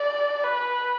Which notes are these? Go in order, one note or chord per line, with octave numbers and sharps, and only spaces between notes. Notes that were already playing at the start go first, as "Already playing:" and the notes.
Already playing: D5
B4